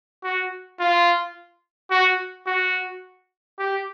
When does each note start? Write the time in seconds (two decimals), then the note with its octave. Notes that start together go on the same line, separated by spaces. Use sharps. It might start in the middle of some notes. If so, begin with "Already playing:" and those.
0.24 F#4
0.80 F4
1.90 F#4
2.47 F#4
3.59 G4